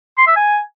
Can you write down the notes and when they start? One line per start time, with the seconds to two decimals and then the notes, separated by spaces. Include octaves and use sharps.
0.18 C6
0.27 E5
0.36 G#5